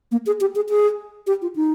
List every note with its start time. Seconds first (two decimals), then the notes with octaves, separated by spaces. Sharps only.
0.12 A#3
0.26 G#4
0.41 G4
0.55 G#4
0.69 G#4
1.27 G4
1.42 F4
1.56 D#4